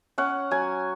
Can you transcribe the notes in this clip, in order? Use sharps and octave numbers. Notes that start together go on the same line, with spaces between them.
C#4 F#5
F#3 G#5